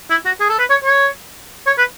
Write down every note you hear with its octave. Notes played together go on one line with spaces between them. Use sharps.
E4
F#4
G#4
A4
B4
C#5
C#5
C#5
B4